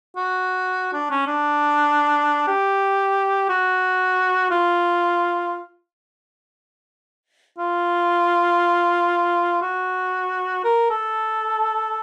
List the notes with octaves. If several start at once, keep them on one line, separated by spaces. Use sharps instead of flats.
F#4
D4
C#4
D4
G4
F#4
F4
F4
F#4
A#4
A4